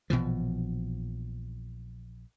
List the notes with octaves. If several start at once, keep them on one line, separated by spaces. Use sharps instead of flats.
A#1 B2 E3 F3